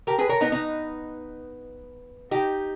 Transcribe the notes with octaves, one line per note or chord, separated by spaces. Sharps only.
G4 A#4
G#4 B4
A#4 C#5
B3 D#4
B3 D#4
D#4 G4